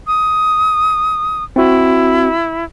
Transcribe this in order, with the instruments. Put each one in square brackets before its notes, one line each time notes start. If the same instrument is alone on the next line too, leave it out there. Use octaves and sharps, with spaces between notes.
[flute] D#6
[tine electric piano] C4 F#4 [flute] E4